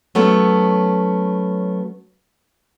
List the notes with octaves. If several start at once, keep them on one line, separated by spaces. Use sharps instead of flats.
F#3 A3 B3 C#4